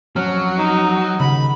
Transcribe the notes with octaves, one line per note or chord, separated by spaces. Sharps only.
F2 F#3 C#4 F6
D#4
D#2 C#3 B5